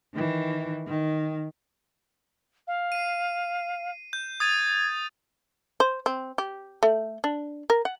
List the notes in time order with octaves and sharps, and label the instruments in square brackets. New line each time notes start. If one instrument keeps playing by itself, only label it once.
[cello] D#3 E3
D#3
[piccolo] F5
[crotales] C7 D#7
G6
[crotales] D#6 A6 D#7 [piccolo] G#6
[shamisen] C5
C4
G4
A3
D4
A#4
F#5